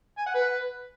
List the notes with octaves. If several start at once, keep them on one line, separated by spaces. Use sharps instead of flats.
G#5
F#5
B4